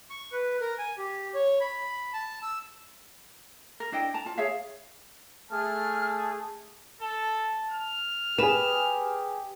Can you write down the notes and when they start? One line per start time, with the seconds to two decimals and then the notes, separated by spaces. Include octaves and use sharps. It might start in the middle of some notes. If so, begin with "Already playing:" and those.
0.10 C#6
0.32 B4
0.61 A#4
0.78 G#5
0.98 G4
1.34 C#5
1.60 B5
2.13 A5
2.43 E6
3.80 A#4
3.92 D4 E4 D#5 G5
4.14 A5 A#5
4.26 F4 A5
4.38 G#4 C#5 E5 F5
5.51 A3 G#4 A5 F6
7.01 A4 A5
7.71 F6
8.38 G4 G#4 B4 E7